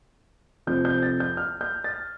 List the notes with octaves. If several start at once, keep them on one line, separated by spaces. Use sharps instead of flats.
F1 F2 F3 G6
G6
A6
G6
F6
G6
A6